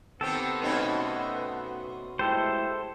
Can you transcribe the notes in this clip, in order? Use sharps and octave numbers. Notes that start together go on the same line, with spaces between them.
D#3 B3 C4 D#4 G4 A4
B2 A3 C4 C#4 D#4 B4
G#3 A3 E4 G4 A4 C5